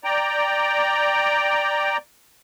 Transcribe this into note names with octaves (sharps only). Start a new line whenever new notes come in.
D5 G5 A#5